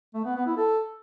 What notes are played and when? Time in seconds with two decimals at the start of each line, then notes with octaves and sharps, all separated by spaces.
0.14 A3
0.25 B3
0.36 B3
0.46 E4
0.57 A4